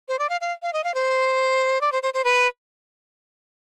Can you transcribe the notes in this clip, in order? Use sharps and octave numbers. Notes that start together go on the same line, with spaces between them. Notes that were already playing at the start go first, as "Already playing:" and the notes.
C5
D5
F5
F5
F5
D#5
F5
C5
D5
C5
C5
C5
B4